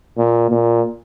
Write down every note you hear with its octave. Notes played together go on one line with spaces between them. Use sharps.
A#2
A#2